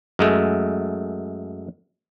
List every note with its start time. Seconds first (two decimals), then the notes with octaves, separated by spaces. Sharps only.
0.19 F#2 G#3 A3